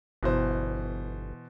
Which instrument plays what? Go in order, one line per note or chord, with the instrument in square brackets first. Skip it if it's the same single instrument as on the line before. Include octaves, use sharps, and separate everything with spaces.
[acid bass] G1 [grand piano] B2 E3 C5